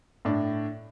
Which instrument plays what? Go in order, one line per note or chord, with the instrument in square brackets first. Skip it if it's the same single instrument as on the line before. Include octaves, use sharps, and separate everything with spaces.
[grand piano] A2 D4